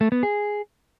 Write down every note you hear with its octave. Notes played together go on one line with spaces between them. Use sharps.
A3
B3
G#4